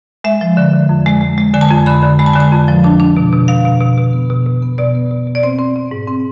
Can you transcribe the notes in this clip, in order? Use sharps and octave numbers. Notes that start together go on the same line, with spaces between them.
G#3 E5
F3
D3
D3
F2
G#3
G#3
G#3
D3 G#5
A5
F2 G#5
D3 B5
D3
G#3 B5
A5
D3 G#5
A5
F2
F3
D4 A5
D4
B2
B2
B2 F5
B2
B2
B2
B3
B2
B2
B3
B2 D5
B3
B2
B2
D5
C4 C5
C4
C4
G#2
C4